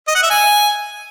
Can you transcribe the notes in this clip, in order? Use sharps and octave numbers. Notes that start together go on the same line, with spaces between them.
D#5
F#5
E5
G#5